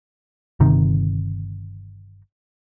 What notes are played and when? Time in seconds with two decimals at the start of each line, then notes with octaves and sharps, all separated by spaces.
0.60 G1 C3 D#3